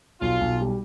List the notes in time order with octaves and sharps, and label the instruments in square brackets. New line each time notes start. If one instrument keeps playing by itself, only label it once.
[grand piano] B1 [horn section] F4
[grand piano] B1
G3